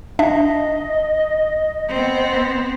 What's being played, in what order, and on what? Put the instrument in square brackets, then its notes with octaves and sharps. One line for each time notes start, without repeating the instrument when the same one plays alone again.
[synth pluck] D4 E5 [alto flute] D#5
[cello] B3 C4